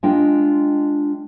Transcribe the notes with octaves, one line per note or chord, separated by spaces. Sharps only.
G#3 D4 F4 D#5 G5